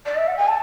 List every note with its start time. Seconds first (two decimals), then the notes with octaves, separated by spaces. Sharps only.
0.06 D5
0.16 E5
0.27 F#5
0.37 G#5
0.48 A5